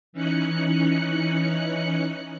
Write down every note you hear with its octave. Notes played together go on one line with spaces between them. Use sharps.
E3 C#4 D#4 F#6 C#7